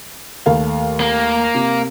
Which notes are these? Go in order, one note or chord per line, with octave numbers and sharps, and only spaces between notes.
D#2 A3 F5
A#3
C3